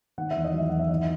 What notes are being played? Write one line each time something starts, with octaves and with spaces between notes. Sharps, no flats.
D#3 F#5
E5
E2
D#5
F#3 E5
E2 F#5
E5
D#3 D#5